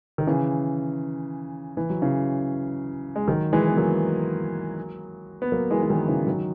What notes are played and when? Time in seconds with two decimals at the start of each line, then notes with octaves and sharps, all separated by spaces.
0.18 D#3
0.27 C#3 E3
1.77 E3
1.90 F#3
2.02 C#3 E3
3.16 G#3
3.27 D#3 F#3
3.53 E3 G#3
3.68 B3
3.77 F#3 A#3
5.42 B3
5.52 F#3 A#3
5.71 E3 G#3
5.83 E3
5.89 D#3 F#3
6.08 C#3 E3
6.27 D#3 F#3